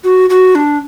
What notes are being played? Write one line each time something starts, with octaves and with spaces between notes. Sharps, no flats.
F#4
F#4
D4